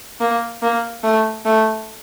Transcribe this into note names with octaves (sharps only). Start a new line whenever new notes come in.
A#3
A#3
A3
A3